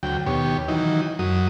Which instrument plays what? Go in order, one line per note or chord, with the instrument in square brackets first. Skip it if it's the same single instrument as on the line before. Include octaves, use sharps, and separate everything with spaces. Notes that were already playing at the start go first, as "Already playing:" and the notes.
[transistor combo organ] D2 F#3 G5
D#2 B2 G4 C#5
D#3 E3 F#3 D#4
F#2 F#3 D#6